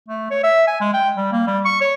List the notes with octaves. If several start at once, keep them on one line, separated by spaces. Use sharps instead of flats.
A3
C#5
E5
G#5
G#3
G5
G3
A#3
G3
C#6
C#5